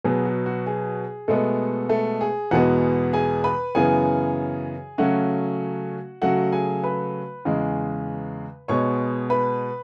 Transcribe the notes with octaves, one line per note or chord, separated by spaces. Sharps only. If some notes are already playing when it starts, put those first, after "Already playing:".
B2 F#3 B3 G#4
F#4
F#4
G#4
B2 G#3 A3 B3 A4
A3 A4
G#4
E2 B2 G#3 B3 F#4 F#5
G#4 G#5
B4 B5
F#2 C#3 E3 B3 G#4 G#5
C#3 F#3 A3 C#4 F#4 F#5
C#3 F#3 A3 F#4 F#5
G#4 G#5
B4 B5
E2 C#3 G#3
B2 G#3 B3 C#5 C#6
B4 B5